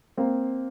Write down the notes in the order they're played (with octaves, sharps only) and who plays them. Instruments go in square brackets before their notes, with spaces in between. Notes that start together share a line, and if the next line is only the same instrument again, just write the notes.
[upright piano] A#3 C4